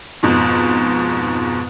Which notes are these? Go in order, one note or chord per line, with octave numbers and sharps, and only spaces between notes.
F2 G#2 B2